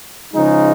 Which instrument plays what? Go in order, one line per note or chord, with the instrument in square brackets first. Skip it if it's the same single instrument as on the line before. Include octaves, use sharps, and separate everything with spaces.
[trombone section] C#3 F3 G#3 D#4